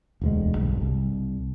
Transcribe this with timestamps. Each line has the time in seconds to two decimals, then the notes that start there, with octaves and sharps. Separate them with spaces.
0.21 E1 D2 G#3
0.57 B1 G2
0.81 C2